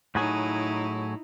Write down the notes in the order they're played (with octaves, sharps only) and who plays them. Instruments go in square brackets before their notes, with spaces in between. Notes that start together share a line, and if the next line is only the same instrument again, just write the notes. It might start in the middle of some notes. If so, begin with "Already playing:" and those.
[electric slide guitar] A2 F#3 G#4 [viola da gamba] D#4 E4